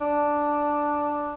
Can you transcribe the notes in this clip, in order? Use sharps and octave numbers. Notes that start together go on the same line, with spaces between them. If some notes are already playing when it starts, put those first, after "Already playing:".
D4